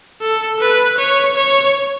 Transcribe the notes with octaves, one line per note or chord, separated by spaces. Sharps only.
A4
B4
C#5
C#5